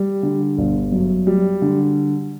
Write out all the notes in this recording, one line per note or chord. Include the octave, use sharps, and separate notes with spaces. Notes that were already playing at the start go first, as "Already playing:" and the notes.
Already playing: G3
D3
G1
F#2
G3
D3